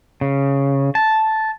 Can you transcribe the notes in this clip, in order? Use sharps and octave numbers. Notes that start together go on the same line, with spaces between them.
C#3
A5